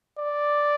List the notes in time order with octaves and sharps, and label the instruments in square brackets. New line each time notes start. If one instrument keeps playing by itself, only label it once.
[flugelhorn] D5